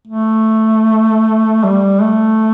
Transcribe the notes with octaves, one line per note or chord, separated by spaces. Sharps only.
A3
G3
A3